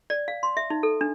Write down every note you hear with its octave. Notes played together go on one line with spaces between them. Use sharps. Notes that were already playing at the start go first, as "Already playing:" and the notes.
D5
F5
C6
E5
D#4
A4
D4